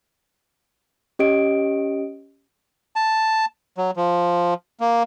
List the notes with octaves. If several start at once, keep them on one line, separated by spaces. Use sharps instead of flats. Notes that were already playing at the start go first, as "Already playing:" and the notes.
C#4 G4 D#5 D7
A5
F#3
F3
A#3